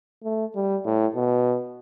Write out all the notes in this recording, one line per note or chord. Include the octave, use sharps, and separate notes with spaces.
A3
G3
A2
B2